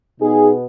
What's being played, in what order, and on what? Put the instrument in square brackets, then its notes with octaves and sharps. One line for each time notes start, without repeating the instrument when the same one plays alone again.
[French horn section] B2 B3 D#4 G#4